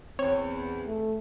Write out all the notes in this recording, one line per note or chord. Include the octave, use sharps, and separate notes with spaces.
E2 C4 C#5
A3